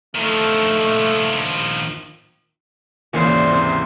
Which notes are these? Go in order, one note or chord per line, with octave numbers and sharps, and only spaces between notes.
D#3 F3 A3
G#1 D#2 A#2 C#3 E3 C5
C3 C4